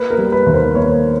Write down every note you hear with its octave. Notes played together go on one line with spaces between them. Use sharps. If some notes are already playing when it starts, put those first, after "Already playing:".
Already playing: A#3 B4
A#4
G3
B4
D#2
A#4 C5
A#3 B4 C#5